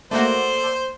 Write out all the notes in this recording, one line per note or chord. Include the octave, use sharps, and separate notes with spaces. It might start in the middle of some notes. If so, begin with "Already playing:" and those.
A3 A#3 F#4 A4 C5 D5